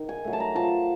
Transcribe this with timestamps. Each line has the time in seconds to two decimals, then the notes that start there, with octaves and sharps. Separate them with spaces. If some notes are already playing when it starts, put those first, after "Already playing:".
Already playing: D#3
0.09 G#5
0.24 F#3 A3
0.33 A5
0.40 A#5
0.55 F3 A5